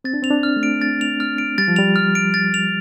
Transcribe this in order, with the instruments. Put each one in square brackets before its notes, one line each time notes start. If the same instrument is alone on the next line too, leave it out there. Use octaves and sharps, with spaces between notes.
[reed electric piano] C4 [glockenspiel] A6
[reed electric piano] D4
[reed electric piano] C4 [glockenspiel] F7
[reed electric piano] D4
[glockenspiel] F6
[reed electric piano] A3
[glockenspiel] D7
A6
F7
F6
D7
[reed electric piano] G3 [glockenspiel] A6
[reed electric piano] F3
[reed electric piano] G3 [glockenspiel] F7
[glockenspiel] F6
D7
A6
F7